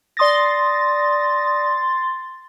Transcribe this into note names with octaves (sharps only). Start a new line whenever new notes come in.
D5 C6 D#6 A6 A#6